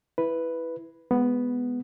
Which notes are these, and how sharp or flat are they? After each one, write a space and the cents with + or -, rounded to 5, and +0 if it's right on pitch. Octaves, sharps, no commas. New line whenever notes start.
E4 +0 B4 +0
G#3 -5 B3 +0